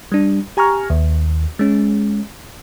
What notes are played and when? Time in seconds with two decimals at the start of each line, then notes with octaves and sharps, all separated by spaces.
0.12 G3 D4
0.57 G4 G#5 A#5 C#6 F6
0.90 D#2
1.59 G#3 C#4